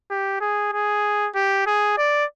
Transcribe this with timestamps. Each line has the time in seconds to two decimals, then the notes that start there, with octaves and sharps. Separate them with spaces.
0.11 G4
0.41 G#4
0.73 G#4
1.35 G4
1.66 G#4
1.98 D5